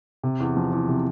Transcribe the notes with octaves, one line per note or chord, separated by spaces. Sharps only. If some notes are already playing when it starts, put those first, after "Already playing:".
C3
E2
F3
E2
C3